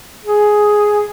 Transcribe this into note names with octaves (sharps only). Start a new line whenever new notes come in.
G#4